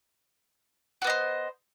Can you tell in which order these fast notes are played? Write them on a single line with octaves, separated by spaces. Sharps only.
F#4 B3 D#5 C5